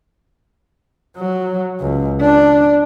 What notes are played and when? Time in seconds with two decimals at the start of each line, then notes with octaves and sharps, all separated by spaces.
1.17 F#3
1.80 C#2
2.21 D4